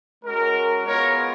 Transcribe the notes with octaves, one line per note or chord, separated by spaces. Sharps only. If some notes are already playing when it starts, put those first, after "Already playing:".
G#3 C#4 F#4 A#4
G#3 B3 F4 A#4 C#5